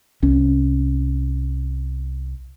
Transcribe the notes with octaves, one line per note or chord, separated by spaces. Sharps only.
C2 C#4